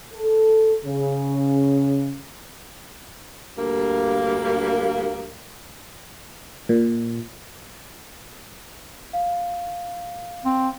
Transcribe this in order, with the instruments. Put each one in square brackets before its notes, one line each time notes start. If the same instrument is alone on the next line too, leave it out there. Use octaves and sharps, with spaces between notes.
[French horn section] A4
C#3
[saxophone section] D2 G2 A#3
[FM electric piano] A#2
[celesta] F5
[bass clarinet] C4